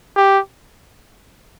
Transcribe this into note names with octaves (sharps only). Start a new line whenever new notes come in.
G4